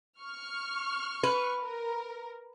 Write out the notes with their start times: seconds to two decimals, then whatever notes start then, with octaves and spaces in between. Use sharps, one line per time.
0.22 C#6 F6
1.23 B4
1.62 A#4